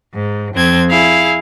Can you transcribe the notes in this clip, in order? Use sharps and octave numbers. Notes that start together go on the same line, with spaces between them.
G#2
F2 C4 G#6
E4 G#4 F5